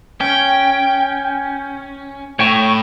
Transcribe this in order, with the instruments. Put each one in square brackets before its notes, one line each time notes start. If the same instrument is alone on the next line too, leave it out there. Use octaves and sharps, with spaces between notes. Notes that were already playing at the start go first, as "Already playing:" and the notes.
[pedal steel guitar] C#4 [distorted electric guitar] G5
[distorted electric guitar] A2 [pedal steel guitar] C#5 G5 C#6